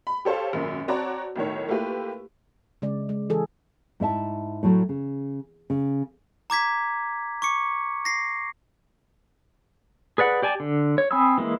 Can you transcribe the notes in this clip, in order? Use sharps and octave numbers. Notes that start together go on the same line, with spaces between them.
B5
G4 A4 C5 C#5 F5
G#1 F#2 A#2
C4 F#4 C#5 D5 A5 A#5
B1 A2 D#3 C#5
A3 A#3 E4 F4 G4 B4
C#3 G#3 D5
G#3
E3 G#4 A4
G#2 E4 E5 A5
A2 F#3 A3
C#3
C#3
A#5 D6 G#6 B6
C#6 D6 C#7
A#6 C7
G#4 B4 D5 F#5
G4 D5 G#5 A5
D3
C#5
C4 G#5 B5 D#6 E6
E3 G#3 A#3 E4